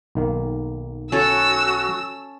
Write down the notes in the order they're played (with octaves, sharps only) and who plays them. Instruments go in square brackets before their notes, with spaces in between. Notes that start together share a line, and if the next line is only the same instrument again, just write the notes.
[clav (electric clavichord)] B1 D#3 A#3
[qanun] C#4 A4 [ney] F#4 [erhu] E6